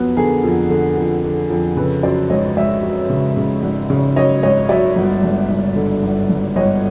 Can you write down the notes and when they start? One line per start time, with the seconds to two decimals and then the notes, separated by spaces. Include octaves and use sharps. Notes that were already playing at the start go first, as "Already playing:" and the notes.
Already playing: F2 F#3 B3
0.17 D3 G#4 A#4
0.44 F2
0.70 D3
0.97 F2
1.23 D3
1.50 F2
1.77 C#3 A4 B4
2.03 F#2 C5 D5
2.30 G#1 C#5 D#5
2.57 G#1 D5 E5
2.83 F#3
3.10 C#3
3.37 C#3
3.63 G#1
3.90 C#3
4.16 F#2 C#5 D#5
4.43 G#1 C#5 D#5
4.69 F#3 D5 E5
4.96 G1
5.23 G1
5.50 G1
5.76 D3
6.03 G1
6.30 G1
6.56 G1 C#5 D#5